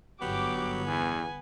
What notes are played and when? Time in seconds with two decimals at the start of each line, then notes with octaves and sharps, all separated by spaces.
0.21 G1 F#3 B3 G4 D6
0.87 E2 G#5